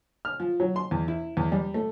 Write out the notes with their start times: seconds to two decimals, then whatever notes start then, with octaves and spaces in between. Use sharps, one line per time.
0.25 F6
0.40 F3
0.60 F#3
0.76 C6
0.91 E2
1.08 E4
1.37 E2
1.52 G3
1.74 A3